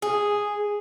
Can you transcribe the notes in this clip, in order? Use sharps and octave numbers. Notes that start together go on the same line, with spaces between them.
G#4